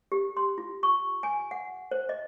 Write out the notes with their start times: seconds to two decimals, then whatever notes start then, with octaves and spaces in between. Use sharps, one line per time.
0.12 G4
0.37 C6
0.58 F4
0.83 C#6
1.23 G#5
1.51 F#5
1.91 C5
2.09 D#5